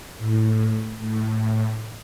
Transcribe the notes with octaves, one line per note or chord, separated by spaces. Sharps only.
A2
A2